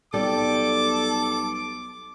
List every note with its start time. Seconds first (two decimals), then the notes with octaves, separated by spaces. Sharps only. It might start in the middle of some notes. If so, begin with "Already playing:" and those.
0.14 B1 G3 A4 D6